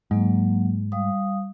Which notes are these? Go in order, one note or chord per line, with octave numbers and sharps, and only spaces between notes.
G#2 F#3 A#3
G3 F5 D#6